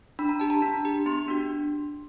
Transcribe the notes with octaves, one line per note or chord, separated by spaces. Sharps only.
D4 B5
A#5
G4 A5
A#5
D4
G4
B3 C6
D4 F#4